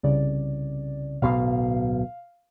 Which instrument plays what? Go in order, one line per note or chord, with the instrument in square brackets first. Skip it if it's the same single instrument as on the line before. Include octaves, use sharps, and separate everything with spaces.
[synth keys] C2 C#3 D5
[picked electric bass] D1 B1 B2 [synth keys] F5